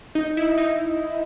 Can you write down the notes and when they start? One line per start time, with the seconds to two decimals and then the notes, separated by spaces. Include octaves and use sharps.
0.15 D#4
0.37 E4
0.58 D#4